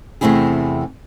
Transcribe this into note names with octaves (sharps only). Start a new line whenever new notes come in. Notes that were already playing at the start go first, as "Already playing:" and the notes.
E2 C3 A3 C4 E4 G#4